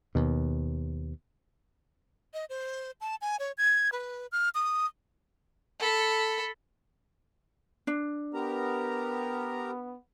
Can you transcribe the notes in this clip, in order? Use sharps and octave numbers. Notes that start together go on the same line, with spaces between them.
D#2 B2
D#5
C5
A5
G#5
C#5
G#6
B4
F6
D#6
A4 B5
D4
B3 G4 A#4 A#5